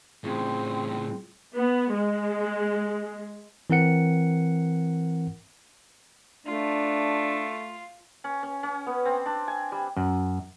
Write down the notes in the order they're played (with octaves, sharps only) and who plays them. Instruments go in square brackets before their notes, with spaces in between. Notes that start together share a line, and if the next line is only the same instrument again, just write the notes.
[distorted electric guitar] A2 C#3 [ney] C4 [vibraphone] F4 G#4
[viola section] B3
G#3
[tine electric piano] E3 C4 A#4 F#5 C#7
[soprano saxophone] A3 [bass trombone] D4 [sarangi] F4
[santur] C#4
C#4
C#4
B3
C4
D4
G#5
G3
[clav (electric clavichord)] F#2